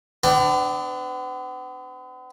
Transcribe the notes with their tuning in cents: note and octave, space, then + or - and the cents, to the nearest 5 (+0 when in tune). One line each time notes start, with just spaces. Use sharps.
B3 +45 D4 +10 G5 +0